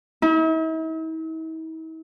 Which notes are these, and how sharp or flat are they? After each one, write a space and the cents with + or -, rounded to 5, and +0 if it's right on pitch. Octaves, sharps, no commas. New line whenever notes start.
E4 -45